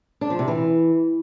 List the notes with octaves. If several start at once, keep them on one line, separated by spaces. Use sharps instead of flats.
D4
F3
C3
E3